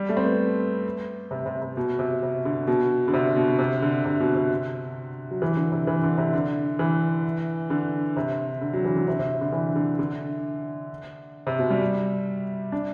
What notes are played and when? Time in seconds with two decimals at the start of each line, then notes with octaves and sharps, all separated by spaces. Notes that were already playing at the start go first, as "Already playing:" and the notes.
Already playing: G3
0.09 A3
0.17 C4
0.25 B3
1.31 C3
1.46 C3
1.62 C3
1.77 B2
1.99 C3
2.23 C3
2.45 D3
2.68 B2
3.08 D3
3.14 C3
3.36 B2
3.59 C3
3.82 D3
4.05 C3
4.20 B2
4.35 C3
5.31 F#3
5.42 E3
5.57 D3
5.72 C3
5.87 E3
6.03 D3
6.18 C3
6.33 D3
6.79 E3
7.70 D3
8.17 C3
8.61 D3
8.73 F#3
8.85 E3
8.96 D3
9.08 C3
9.19 C3
9.41 D3
9.53 E3
9.76 D3
9.99 D3
11.47 C3
11.59 B2
11.70 G3
12.72 D4